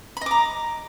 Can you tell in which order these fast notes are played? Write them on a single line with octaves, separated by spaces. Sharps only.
B5 D#5 D6 A#5